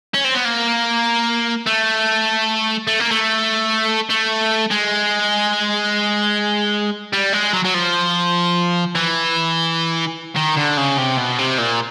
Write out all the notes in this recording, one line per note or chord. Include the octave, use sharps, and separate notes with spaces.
C#4
C4
B3
A#3
A3
A3
A#3
A3
A3
G#3
G3
G#3
F#3
F#3
F3
E3
D#3
D3
C#3
C3
B2
C3
A#2